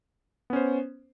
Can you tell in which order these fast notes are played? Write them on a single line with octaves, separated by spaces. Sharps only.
B3 C#4 C5